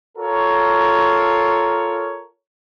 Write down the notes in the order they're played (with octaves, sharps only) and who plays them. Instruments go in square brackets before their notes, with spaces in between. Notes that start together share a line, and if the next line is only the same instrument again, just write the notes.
[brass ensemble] F4 A4 A#4 C#5